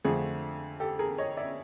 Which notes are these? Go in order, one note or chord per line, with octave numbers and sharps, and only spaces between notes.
F2 D3 F3 A3 G#4
G4 A4
G#4 A#4
C#5 D#5
D5 E5